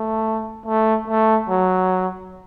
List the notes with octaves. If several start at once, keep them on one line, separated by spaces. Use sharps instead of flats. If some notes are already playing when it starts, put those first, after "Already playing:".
Already playing: A3
A3
A3
F#3